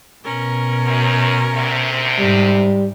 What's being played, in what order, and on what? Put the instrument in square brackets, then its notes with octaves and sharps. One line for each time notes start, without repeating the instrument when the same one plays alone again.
[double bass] B2 [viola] C#4 A#4
[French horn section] F#2
D2 C3
[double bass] G#2 [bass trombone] G3